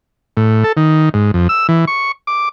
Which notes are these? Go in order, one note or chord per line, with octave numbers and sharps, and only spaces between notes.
A2
A4
D#3
G#2
F2
E6
E3
C#6
D6